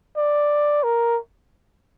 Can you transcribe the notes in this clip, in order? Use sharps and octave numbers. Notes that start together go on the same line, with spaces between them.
D5
A#4